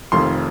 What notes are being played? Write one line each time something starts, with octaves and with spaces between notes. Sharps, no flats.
F1 F2 D#3 C6